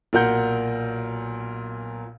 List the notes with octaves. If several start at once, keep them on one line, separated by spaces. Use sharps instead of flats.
B1 A#2 A#4 F#5 G6